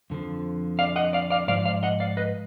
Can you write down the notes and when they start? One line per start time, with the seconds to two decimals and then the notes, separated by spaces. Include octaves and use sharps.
0.10 F2 D3 F3
0.79 D5 F5
0.96 D#5 F#5
1.13 D5 F5
1.30 D5 F5
1.48 G#2 F3 D5 F5
1.66 D5 F5
1.83 D#5 F#5
2.00 D5 F5
2.17 B4 D#5